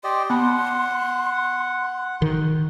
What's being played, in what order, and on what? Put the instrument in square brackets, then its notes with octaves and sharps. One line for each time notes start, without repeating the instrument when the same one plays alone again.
[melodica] G4 D5 D#5 [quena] C6
[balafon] B3 B5 [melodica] F#5
[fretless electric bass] D#3